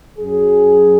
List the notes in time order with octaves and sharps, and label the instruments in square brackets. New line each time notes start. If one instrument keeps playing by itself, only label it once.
[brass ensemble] F#2 F#3 G#4